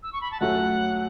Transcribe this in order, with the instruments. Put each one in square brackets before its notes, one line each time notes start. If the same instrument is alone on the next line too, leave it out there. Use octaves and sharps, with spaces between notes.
[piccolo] E6
C#6
B5
A5
[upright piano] F#2 F#3 A3 [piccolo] F#5